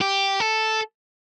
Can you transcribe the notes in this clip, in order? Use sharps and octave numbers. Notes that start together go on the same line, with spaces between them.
G4
A4